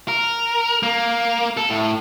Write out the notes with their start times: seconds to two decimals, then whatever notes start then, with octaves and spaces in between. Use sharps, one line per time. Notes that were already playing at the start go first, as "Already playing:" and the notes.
0.08 A#4
0.83 A#3
1.57 A4
1.70 A2